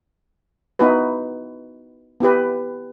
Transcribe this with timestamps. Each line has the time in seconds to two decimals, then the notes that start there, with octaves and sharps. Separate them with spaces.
0.79 B3 D#4 E4 F#4 B4
2.20 B3 E4 G4 B4